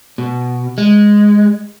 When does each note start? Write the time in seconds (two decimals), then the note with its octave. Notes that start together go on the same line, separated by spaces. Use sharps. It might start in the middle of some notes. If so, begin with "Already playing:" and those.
0.18 B2
0.78 G#3